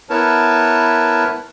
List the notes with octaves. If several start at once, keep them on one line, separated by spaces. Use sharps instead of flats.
B3 E4 A#4 B4 C#5 A5